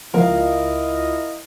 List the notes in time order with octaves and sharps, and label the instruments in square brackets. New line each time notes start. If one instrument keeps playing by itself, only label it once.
[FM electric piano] C#2 F4 [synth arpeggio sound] F3 A#3 [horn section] E4 D#5 [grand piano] A#4 F5